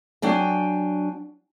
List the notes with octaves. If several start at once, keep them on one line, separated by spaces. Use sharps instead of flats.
F#3 D4 G5 G#5